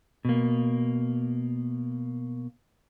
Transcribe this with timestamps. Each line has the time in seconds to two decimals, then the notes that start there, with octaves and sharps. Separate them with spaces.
0.25 B2 A#3